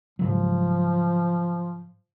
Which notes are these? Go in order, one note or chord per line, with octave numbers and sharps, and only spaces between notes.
G#2 C#3 F3 F#3